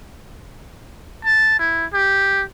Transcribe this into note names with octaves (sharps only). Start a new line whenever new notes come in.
A5
E4
G4